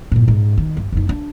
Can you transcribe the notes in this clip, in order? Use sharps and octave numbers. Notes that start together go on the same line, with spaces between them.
G2 A#2
G#2
D#3
G1
F#1 D#4
D4